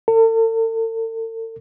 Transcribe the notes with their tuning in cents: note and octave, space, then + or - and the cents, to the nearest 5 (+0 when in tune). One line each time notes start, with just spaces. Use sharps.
A4 +45